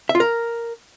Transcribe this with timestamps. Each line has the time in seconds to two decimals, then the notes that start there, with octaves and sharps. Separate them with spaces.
0.09 E5
0.15 F4
0.20 A#4